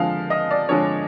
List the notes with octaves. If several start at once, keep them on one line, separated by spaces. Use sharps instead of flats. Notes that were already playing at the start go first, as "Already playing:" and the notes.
Already playing: D3 F3 G#3 F5
D#5
D5
D3 F3 G#3 C#5